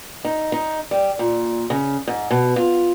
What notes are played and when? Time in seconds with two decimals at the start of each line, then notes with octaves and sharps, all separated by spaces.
0.25 D#4
0.52 D#4
0.91 G3
1.19 A#2
1.70 C#3
2.08 G#2
2.31 B2
2.56 F4